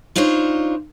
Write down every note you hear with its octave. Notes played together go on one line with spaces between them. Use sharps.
D4 D#4 F4 C5 C#5